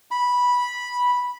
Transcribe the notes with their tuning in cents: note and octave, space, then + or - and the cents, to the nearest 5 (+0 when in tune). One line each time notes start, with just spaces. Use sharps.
B5 -10